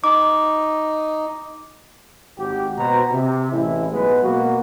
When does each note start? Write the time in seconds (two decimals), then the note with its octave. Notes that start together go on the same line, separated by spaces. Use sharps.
0.04 D#4 D6
2.38 G#1 F#4 G4
2.77 B2 C5 A#5
3.12 C3
3.51 A1 A2 G#3 E4
3.92 B1 G#3 B3 B4
4.22 B2 A#3 F#4